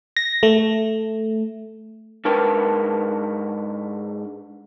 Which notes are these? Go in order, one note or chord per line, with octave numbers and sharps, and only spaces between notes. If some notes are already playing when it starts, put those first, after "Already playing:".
A#6
A3
G#2 D4 A#4 B4 G5 A5